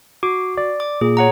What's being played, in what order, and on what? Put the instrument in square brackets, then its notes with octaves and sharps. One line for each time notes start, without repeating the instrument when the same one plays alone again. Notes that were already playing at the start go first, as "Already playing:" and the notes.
[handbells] F#4 [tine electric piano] D6
[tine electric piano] D5
[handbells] D6
[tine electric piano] A#2 [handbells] G#4
[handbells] C#5 F#5 A#5